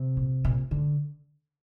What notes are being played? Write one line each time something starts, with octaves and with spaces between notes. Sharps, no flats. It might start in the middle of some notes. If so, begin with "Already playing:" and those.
Already playing: C3
A#2
A#2
G#2 D3